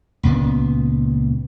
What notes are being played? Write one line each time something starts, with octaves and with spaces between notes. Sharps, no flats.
C#2 A#2 B3